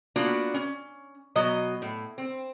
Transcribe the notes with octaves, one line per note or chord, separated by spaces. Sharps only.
A#3 B3 D4 F4 F#4
C#4
B2 F#3 D#5
A2
C4